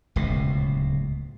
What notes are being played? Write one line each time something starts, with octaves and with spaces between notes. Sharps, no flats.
D1 C#2 B2